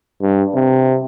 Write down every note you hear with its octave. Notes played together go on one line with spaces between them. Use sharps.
G2
C3